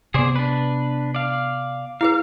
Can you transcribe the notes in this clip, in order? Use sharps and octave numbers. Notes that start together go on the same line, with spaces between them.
C3 B3 G#4 C5 D5
D4 B4
D5 F5
E4 G#4 B4 F5